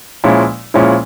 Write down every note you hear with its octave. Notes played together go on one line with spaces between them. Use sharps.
A#2 F3 G#3 C#4 E4
A#2 F3 G#3 C#4 E4